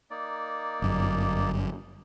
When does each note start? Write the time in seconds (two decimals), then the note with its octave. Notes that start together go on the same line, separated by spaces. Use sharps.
0.10 A#3 D#4 D5
0.82 G1 F#2